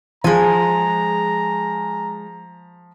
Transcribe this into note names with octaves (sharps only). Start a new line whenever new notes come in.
F3 G#3 G#5 A#5